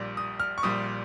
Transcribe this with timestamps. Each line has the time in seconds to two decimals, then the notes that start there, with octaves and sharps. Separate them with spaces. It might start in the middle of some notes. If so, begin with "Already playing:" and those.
Already playing: A#1 A#2 G3
0.17 D#6
0.40 F6
0.58 C#6
0.63 A#1 A#2 G3 D#6